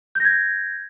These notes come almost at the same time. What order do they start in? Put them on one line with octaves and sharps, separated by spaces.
G6 A#6 G#6